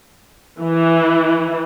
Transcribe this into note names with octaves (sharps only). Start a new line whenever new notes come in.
E3